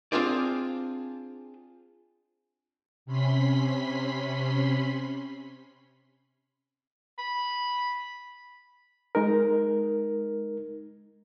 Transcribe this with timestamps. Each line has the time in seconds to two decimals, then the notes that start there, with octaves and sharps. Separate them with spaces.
0.12 C4 D4 F4 G#4 C5 D5
3.06 C3 C#4 B5 C6 B6
7.18 B5
9.15 G#3 D#4 A#4